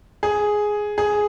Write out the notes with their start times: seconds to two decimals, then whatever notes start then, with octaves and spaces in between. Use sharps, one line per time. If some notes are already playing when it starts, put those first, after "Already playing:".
0.23 G#4
0.98 G#4